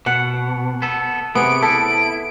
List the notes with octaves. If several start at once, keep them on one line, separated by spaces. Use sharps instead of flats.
B2 F#5
B3 A4
C3 B3 G#4 D7
E4 A4